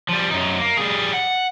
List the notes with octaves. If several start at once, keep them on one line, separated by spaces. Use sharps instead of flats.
F3 G3
F#2 D#4
A#3
G3 G#4
F#5